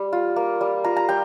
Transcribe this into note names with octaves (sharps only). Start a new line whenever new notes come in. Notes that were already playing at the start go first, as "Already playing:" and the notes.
Already playing: G3
F4
A#3
G3
F4 A#5
A#5
G3 G5